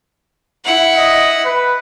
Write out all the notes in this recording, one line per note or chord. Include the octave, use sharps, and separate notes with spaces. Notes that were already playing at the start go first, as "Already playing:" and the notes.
E4 F#5
D#5
B4